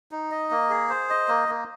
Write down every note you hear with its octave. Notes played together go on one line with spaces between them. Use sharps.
D#4
D#5
A#3
G#4
C5
D#5
A#3
A#3